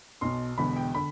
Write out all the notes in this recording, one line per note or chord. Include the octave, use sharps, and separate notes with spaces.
B1 B2 C6
E1 E2 D3 B5
G5
D3 B5